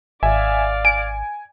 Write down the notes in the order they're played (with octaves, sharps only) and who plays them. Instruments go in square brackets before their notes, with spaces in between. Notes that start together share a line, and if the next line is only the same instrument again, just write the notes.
[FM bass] G#1 [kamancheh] D5 F5 [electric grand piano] E5 G#5
[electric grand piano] G#5 [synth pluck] D7